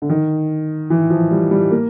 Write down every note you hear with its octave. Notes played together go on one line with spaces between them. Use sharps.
D3
D#3
E3
F3
G3
G3
A#3